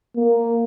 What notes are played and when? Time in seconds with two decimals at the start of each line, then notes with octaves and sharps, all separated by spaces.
0.17 A#3